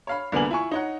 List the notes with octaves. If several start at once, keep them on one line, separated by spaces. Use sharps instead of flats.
C#5 F5 B5
C2 D3 A#3 B3 G#5 F#7
E4 F4 G#5 C#6
D#4 C#5 F#5